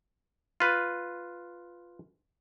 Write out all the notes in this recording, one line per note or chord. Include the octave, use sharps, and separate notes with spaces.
F4 B4